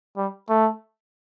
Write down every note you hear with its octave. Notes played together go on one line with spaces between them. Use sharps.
G3
A3